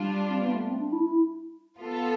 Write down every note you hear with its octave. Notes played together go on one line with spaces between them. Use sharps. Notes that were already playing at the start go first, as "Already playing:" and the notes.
Already playing: G3 D4 F4
C4
B3
A3
C4
D4
E4
E4
B3 F4 A4